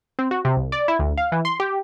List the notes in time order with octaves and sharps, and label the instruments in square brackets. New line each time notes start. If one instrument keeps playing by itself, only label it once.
[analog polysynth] C4
F#4
C3
C2
D5
E4
D2
F5
E3
C6
G4